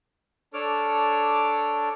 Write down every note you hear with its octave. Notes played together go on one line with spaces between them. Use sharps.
D4 A4 C#5 D6 F6